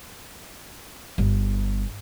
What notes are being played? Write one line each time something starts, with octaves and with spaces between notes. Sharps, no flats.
G1